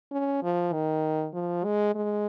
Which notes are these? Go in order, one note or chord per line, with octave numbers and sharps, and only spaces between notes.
C#4
F3
D#3
F3
G#3
G#3